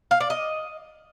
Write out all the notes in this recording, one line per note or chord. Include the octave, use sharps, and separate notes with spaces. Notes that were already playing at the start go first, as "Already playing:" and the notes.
F5
D5
D#5